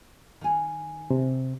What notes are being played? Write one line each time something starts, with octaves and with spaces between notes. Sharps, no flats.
D#3 G#5
C3